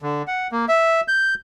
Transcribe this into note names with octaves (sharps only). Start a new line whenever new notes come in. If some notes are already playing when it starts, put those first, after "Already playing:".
D3
F#5
A#3
E5
G6